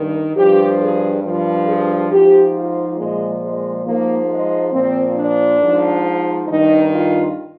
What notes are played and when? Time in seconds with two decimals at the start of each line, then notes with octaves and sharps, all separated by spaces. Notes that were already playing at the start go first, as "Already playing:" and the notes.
Already playing: G2 D#3
0.36 G2 F3 G4
0.80 G#4
1.24 G2 F3
1.67 G#4
2.10 G#2 F3 G4
2.55 F4
2.98 A#2 F3 G#3
3.42 G#3
3.85 G#2 F3 A#3
4.29 G#3
4.73 A#2 F3 C4
5.16 D4
5.61 G#2 F3
6.48 G2 D#3 D#4
6.92 F4